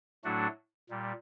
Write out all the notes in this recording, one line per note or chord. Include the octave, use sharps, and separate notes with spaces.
A2 F#3 A3 D4 F#4
A#2 G3